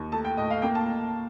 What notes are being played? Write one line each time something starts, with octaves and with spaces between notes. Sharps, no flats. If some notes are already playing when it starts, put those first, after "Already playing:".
Already playing: D#2
A3 A5
G5
A2 D#5
F5
A#3 G5
A5